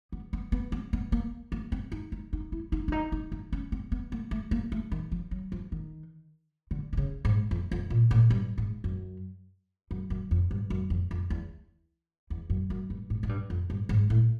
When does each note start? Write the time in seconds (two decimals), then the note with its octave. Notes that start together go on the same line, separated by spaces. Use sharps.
0.12 B3
0.33 B3
0.52 B3
0.72 C4
0.93 B3
1.12 A#3
1.52 A#3
1.72 C4
1.92 D#4
2.12 D#4
2.33 D#4
2.52 E4
2.72 D#4
2.88 D4
2.92 D#4
3.12 D#4
3.32 D#4
3.52 C#4
3.72 C4
3.92 B3
4.12 A#3
4.31 A3
4.51 A#3
4.72 A3
4.92 D#3
5.12 F3
5.31 F#3
5.52 F3
5.72 D#3
6.71 D3
6.93 D3
6.97 C#3
7.25 G#2
7.51 F2
7.72 F2
7.90 A#2
8.11 A2
8.30 G2
8.58 G#2
8.84 F#2
9.91 F#2
10.10 F#2
10.31 F2
10.51 G2
10.70 F#2
10.90 F2
11.11 F2
11.30 E2
12.30 E2
12.50 F#2
12.70 F#2
12.90 G2
13.10 G#2
13.23 G#2
13.29 G2
13.50 F2
13.70 G2
13.89 G#2
14.10 A2